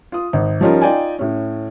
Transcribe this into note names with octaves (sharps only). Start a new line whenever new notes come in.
F4 D#6
G#1
F3 G3 C#4 D#4 F4 A#4
D#4 F4 D5 G5 G#5
A2 C#4